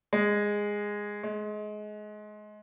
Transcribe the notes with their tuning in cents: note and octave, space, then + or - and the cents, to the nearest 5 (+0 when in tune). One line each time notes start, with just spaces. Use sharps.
G#3 -10
G#3 +25